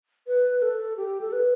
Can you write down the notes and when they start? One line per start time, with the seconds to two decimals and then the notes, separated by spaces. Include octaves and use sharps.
0.27 B4
0.62 A4
0.97 G4
1.21 A4
1.32 B4